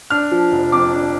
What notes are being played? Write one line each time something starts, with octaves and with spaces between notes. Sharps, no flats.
D4 F6
F3
F1
F2 D6
D4